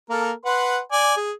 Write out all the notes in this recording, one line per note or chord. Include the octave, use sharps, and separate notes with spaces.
A#3 A4 A#4
B4 F#5 C6
D5 G#5
G#4